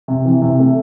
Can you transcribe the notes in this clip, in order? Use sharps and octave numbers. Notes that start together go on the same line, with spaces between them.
C3
E3
C3
A3